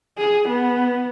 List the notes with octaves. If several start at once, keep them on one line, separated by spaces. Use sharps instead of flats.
G#4
B3